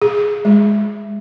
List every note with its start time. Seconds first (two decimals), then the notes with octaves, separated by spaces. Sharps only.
0.02 G#4
0.45 G#3